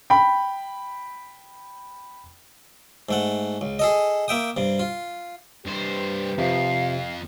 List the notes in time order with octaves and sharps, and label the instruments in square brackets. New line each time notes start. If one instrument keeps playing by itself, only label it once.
[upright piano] G5 B5
[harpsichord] G#2 A3 F#5
C#2
G#4 A4 D#5
A#3 E5 G5 D#6
G2 C3
F4
[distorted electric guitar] G2 C5 [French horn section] G4 B4
[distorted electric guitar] F2 [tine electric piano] C3 F3 [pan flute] F5